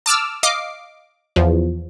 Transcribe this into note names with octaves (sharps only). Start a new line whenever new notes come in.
A5 D6 E6 F6
D#5 F5 D6 C7
E2 F3